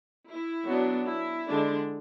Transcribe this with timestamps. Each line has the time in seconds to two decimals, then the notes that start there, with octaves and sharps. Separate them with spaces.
0.28 E4
0.68 F#3 B3 D4
1.07 E4
1.47 D3 G#3 D4